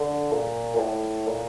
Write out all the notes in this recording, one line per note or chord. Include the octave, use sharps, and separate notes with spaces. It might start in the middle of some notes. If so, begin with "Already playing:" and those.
Already playing: D3
A#2
A#2
A2
A#2